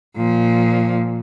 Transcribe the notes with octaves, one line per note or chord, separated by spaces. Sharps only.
A#2 F3